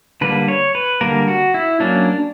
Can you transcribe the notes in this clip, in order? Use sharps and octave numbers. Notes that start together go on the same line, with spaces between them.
D3 G3 A#3 B4
C#5
B4
D3 G3 A#3 A#4
F#4
E4
F#3 A#3 C#4 D4